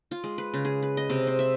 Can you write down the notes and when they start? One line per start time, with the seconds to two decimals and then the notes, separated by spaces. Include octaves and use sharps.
0.11 F4
0.24 G#3
0.38 B4
0.54 C#3
0.65 G#4
0.83 B4
0.97 D#5
1.09 C3
1.27 C5
1.39 E5